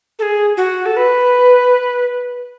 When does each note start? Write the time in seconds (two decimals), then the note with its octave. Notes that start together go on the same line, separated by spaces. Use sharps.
0.19 A4
0.23 G#4
0.57 F#4
0.86 A4
0.97 B4